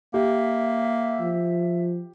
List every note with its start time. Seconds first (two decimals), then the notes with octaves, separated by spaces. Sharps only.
0.14 A#3 G4 E5
1.20 F3